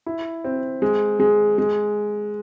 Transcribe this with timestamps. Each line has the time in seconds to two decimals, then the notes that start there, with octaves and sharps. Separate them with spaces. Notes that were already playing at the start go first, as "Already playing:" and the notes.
0.06 E4
0.44 C4
0.82 G#3
1.20 G#3
1.58 G#3